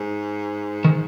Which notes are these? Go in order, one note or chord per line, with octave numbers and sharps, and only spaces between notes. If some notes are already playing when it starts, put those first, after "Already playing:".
Already playing: G#2
D#3